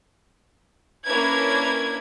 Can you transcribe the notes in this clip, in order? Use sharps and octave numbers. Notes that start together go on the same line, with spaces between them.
A#3 C#4 D4 E4 B4 G#6